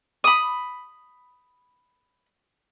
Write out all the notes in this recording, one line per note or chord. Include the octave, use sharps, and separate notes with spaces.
B5 D#6